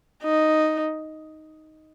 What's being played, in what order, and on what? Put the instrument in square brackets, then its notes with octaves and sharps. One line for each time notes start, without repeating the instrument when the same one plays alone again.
[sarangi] D#4